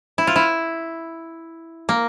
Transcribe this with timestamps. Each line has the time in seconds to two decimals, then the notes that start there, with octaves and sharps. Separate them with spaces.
0.18 E4
0.27 F4
0.36 E4
1.89 A#3